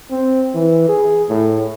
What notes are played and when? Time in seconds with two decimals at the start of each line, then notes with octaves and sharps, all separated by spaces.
0.11 C4
0.54 E3
0.89 G#4
1.30 A2